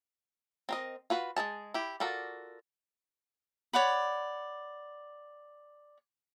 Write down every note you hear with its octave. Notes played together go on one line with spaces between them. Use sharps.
C4 A#4 D#5
F4 F#4 B4
G#3 E4 G#4 A5
E4 G4
F4 F#4 A4 A#4 D5
C#5 D5 F#5 B5